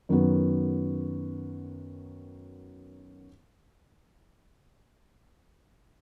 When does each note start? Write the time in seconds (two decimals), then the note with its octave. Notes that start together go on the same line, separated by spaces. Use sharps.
0.09 F#2 D#3 F#3 B3